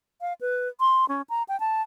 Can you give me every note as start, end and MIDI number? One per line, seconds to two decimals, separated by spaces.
0.21 0.33 77
0.41 0.68 71
0.80 1.07 84
1.08 1.22 61
1.29 1.43 82
1.48 1.59 79
1.60 1.82 81